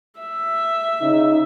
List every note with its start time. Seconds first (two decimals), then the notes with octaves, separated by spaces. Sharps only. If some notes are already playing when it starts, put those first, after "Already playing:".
0.20 E5
1.01 C#3 D#4